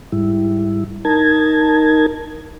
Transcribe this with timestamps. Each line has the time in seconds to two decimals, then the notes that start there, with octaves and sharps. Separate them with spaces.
0.12 G#2 G3 E4
1.05 D#4 A#4 A5 G#6